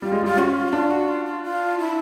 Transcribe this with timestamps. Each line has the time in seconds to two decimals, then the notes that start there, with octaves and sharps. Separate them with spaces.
0.02 G3 F4
0.12 G#3
0.23 G3 F4
0.37 C#4 F#4
0.50 F4
0.69 F#4
0.73 D4 F4
0.91 F#4
1.08 F4
1.26 F4
1.43 F4
1.79 E4